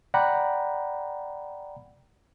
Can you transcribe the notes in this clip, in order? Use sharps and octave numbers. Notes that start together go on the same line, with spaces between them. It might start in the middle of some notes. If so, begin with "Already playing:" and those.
D5 F#5 G5 A#5 B5